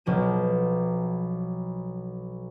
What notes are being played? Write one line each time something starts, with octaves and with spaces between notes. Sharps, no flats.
B1 B2 F3 D#7